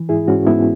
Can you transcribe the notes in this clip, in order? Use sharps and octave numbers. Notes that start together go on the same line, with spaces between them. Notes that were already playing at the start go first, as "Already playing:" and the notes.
Already playing: E3
G#2 E4 G#4
G#2 C#4 F#4
G#2 B3 E4